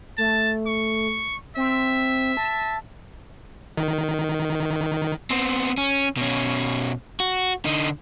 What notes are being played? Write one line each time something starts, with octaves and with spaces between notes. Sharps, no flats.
A3 A5
C#6
C4 E5
A5
D#3
B3 C4
C#4
B2 C#4
F#4
D3 D#4